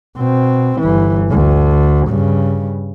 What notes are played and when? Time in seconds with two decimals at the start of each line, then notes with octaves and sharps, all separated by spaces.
0.17 B2 C4
0.79 G1 E3
1.30 D2
2.08 G2 C#3